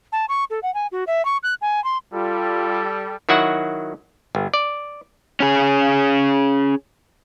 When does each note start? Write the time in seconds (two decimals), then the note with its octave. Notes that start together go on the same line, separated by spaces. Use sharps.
0.12 A5
0.29 C#6
0.50 A4
0.63 F#5
0.74 G#5
0.92 F#4
1.07 E5
1.25 C#6
1.43 F#6
1.61 G#5
1.84 C6
2.14 G3 F4 A4
3.29 D#3 F#3 E4 F#4 F#5
4.35 G1
4.54 D5
5.40 C#4 G#4